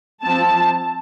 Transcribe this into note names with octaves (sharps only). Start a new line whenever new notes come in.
F3 C4 A5